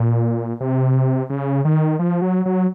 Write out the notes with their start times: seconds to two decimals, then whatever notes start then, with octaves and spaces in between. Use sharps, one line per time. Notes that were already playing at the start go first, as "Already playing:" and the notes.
Already playing: A#2
0.61 C3
1.30 C#3
1.65 D#3
1.99 F3
2.22 F#3
2.46 F#3